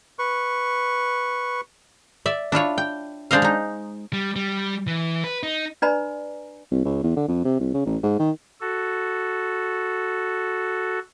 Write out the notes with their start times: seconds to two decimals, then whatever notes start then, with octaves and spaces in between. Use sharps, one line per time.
0.19 B4 C#6
2.26 D5 E5
2.52 D4 E4 F4 C#5
2.78 G5
3.31 G#3 D4 C5 D5 D#5 F5
3.42 G#3 D#4
4.13 G3
4.36 G3
4.87 E3
5.24 B4
5.43 D#4
5.82 D4 B4 D5 G#5 A#5 B5
6.71 C2
6.85 C#2
7.03 E2
7.16 D3
7.29 F2
7.45 C3
7.60 C2
7.74 C#3
7.86 A1
8.03 G#2
8.19 D#3
8.61 F#4 A4